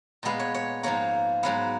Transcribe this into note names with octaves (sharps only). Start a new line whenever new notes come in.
A#2 G#3 B3 F5
C#5
C#5
G#2 F3 A#3 C#5
G#2 F#3 B3 F5